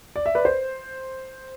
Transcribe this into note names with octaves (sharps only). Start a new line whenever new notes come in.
D5
E5
B4 D5
C5